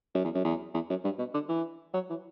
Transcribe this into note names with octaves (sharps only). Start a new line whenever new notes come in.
F#2
E2
F#2
E2
E2
F#2
G2
B2
D3
E3
F#3
E3